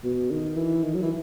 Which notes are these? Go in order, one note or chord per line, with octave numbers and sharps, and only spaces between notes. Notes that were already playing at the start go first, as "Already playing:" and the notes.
B2
D#3
E3
D#3
F#3
E3